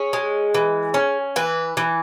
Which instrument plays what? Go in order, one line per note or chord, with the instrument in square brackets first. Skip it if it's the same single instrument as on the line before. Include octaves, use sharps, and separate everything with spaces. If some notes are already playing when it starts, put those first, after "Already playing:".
Already playing: [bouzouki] C#4 G#4
G#3
E3
C#4
E3 B4
E3